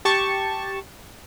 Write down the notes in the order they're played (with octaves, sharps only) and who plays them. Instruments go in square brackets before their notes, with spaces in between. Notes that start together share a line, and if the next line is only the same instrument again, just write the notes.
[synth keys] G4 A5 C#6